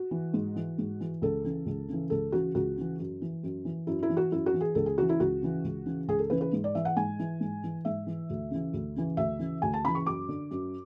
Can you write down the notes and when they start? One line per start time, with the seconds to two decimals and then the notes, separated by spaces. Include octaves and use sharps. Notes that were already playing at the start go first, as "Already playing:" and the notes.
Already playing: F#4
0.11 E3
0.34 G#2
0.56 E3
0.78 G#2
1.00 E3
1.22 C#2 A4
1.45 C#3 E3
1.66 C#2
1.89 C#3 E3
2.10 C#2 A4
2.32 C#3 E3 F#4
2.55 C#2 F#4
2.77 C#3 E3
2.99 F#2
3.22 E3
3.43 F#2
3.65 E3
3.87 F#2 E4
4.03 E4
4.10 E3
4.17 F#4
4.32 F#2 E4
4.46 F#4
4.54 E3
4.61 G#4
4.75 C#2 A4
4.86 G#4
4.97 C#3 E3 F#4
5.09 E4
5.20 C#2 F#4
5.42 C#3 E3
5.64 C#2
5.86 C#3 E3
6.08 C#2 G#4
6.19 A4
6.30 C#3 E3 B4
6.41 B4
6.53 G#2
6.64 D5
6.75 E3 E5
6.85 F#5
6.97 G#2 G#5
7.19 E3
7.41 G#2
7.64 E3
7.85 G#2 E5
8.07 E3
8.30 D2
8.51 C#3 E3
8.73 D2
8.96 C#3 E3
9.17 D2 E5
9.39 C#3 E3
9.62 D2 G#5
9.74 A5
9.84 C#3 E3 B5
9.95 C#6
10.06 F#2 D6
10.29 D3
10.51 F#2